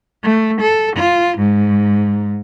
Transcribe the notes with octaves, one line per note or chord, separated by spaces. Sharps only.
A3
A4
F4
G#2